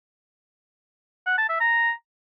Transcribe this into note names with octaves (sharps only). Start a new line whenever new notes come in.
F#5
A5
E5
A#5